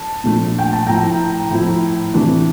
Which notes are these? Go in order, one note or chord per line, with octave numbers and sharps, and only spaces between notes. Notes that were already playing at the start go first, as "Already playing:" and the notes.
Already playing: A5
A#2 F3 A3 D4
G5
A5
A2 F3 A3 E4 G5 A#5
A2 F3 A3 E4
C3 E3 A3 D4